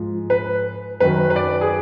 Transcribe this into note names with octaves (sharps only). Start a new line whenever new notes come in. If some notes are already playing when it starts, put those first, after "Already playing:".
Already playing: G#2 F3
B4
F#2 D#3 F#3 B4
B4
D5
G#4